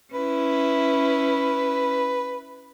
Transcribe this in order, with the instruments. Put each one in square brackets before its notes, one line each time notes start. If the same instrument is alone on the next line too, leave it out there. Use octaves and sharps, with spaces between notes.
[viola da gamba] C#4 E4 [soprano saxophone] B4